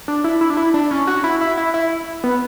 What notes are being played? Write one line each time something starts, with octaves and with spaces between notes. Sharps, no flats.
D4
E4
E4
D4
E4
D4
C#4
F#4
E4
E4
E4
E4
B3